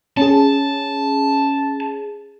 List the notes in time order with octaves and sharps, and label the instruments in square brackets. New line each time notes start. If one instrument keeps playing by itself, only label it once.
[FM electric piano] C#4 G#4 [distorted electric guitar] A5